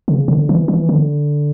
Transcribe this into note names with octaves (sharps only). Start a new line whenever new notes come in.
C#3
D3
E3
E3
D3